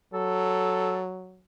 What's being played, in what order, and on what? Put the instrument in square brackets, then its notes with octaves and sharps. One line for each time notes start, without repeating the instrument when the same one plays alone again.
[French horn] F#3 [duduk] A4